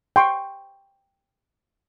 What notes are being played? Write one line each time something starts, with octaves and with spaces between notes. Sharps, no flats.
G5 C6 C#6